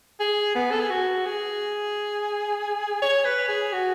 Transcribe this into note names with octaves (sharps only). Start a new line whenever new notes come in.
G#4
B3
A4
G#4
F#4
G#4
C#5
B4
G#4
F#4